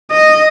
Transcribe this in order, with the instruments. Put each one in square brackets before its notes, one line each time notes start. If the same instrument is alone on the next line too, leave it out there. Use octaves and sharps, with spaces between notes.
[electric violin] D#5